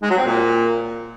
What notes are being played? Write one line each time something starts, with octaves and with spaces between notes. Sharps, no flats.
G#3
F#3
C4
A#2